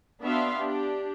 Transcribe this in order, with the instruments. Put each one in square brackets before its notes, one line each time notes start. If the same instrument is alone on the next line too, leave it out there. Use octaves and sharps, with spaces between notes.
[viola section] B3 D4 F#4 E5 F5 C6
D4 G4